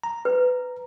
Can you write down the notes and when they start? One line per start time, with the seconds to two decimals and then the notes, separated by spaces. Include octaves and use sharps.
0.03 A#5
0.25 B4